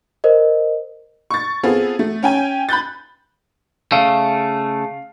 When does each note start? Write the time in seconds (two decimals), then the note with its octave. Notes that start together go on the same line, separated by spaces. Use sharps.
0.24 A#4 C5 D#5
1.30 C#6 A6
1.63 B3 C4 F4 G#4 A4
1.99 A3
2.23 C#4 G5 G#5
2.69 B5 F#6 G6 A6
3.92 C#3 A3 F5